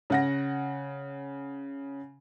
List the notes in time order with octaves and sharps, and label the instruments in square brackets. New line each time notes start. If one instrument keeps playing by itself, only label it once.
[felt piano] C#3 F#5 A#6